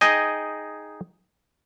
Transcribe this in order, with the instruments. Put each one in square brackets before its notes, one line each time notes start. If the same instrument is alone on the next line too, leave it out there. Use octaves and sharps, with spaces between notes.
[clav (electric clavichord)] D#4 G#4 D#5 G5 G#5